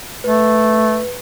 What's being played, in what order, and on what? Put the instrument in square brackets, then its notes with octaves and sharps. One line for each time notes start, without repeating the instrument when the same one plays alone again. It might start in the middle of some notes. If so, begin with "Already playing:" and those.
[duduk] A3 [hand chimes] B4